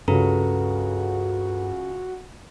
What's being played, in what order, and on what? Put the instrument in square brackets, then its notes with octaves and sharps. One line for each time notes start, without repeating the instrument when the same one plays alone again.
[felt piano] C#2 C#3 [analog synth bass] G2 [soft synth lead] F#4 [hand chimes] A4 B4 A#5